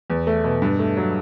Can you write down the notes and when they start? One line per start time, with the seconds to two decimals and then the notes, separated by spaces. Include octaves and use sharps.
0.10 E2
0.27 A3
0.44 B2
0.62 G2
0.79 A3
0.97 F#3